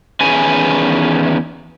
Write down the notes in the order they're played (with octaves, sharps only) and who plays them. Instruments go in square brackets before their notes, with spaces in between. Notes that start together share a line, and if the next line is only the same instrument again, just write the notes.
[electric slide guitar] E2 D#3 C#4 G#4 B4 G#5